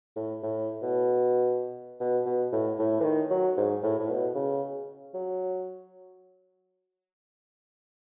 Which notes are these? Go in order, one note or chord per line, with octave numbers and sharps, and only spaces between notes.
A2
A2
B2
B2
B2
A2
A2
E3
D#3
F#3
G#2
A2
A2
B2
C#3
F#3